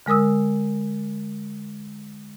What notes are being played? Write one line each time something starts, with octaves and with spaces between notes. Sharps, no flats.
D3 G#3 A#4 D#6 E6